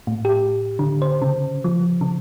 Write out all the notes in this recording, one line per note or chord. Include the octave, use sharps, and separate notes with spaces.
A2
G4
D3
C5
C#3
F3
C#3